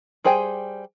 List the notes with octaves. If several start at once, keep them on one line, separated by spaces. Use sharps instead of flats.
G3 G#4 C5 G5 G#5